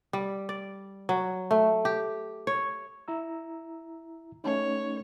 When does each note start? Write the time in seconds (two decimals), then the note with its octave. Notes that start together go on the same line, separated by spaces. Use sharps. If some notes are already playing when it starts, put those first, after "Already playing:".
0.13 G3
0.49 D5
1.09 F#3
1.51 A3
1.85 G4
2.47 C#5
3.08 E4 A#5 E6
4.44 A3 C#4 D#4 C#5